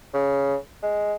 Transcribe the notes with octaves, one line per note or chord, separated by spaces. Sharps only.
C#3
G#3